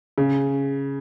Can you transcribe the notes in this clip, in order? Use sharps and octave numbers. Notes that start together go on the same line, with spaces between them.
C#3